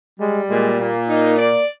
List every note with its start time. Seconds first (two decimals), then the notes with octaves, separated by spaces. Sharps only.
0.20 G3 G#3
0.49 A#2 G#3
0.79 A#2 A#3
1.09 D#4
1.38 D5